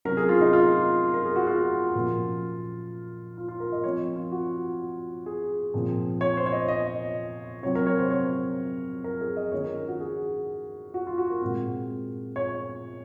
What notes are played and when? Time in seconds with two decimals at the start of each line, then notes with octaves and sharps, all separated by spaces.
0.05 C3 F#3 C#4 A#4
0.17 G#4
0.29 F4
0.41 D#4
0.53 F4
1.14 A#4
1.25 G#4
1.36 F#4
1.47 F4
1.95 A#2 F3 A#3 C#4
3.37 F4
3.48 F4
3.60 A#4
3.72 D#5
3.84 F3 C4 C#5
4.16 F4
4.32 F#4
5.26 G#4
5.74 A#2 F3 C4
6.21 C#5
6.37 C5
6.46 C#5
6.52 D#5
6.68 D#5
7.63 C3 F#3 C4 C#5
7.75 A#4
7.86 C#5
7.99 C5
8.10 C#5
9.04 A#4
9.21 G#4
9.37 D#5
9.52 D#3 A#3 C#4 C#5
9.64 A#4
9.88 F#4
10.00 G#4
10.94 F#4
11.07 F4
11.18 F#4
11.30 A#4
11.42 A#2 G#3 C4
12.36 C#5